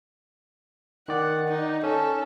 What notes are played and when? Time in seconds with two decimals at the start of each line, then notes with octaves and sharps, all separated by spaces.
1.08 D#3 D5 F#5
1.47 D#4
1.84 C#4 A4